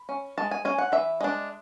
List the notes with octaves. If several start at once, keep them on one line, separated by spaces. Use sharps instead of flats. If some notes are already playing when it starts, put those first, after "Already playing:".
Already playing: B5
C#4
G#3 A5
G#5
C#4 G#5
F#5
E3 E5
G#3 D4